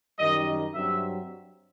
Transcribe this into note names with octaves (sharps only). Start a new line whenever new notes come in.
F#2 D#3 G3 D#5
G2 F#3 C4 E5